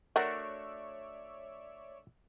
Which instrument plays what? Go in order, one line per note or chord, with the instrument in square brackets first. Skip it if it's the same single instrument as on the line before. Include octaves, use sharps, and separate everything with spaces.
[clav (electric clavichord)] A3 D4 F#4 [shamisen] A#4 F#5 [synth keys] C#5 D5 E5